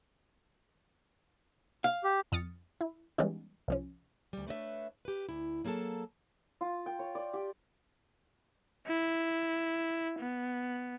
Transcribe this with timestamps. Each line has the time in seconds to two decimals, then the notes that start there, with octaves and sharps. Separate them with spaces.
1.84 F5
2.04 G4
2.32 F2 D#6 F6 A6 C#7
2.81 E4
3.18 E3 G3 G#3 B3 C#4 D#4
3.68 C2 F3 C#4
4.33 D2 G3
4.47 A3 D4 B4 C#5 D#5 E5
5.05 G4 B4
5.29 D2 E4
5.65 F#3 A#3 G#4 A4 A5
6.61 F4
6.86 G5
6.99 C#5
7.15 D5
7.34 G4
8.87 E4
10.19 B3